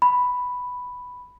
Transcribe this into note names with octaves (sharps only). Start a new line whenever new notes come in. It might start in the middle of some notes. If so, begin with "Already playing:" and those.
B5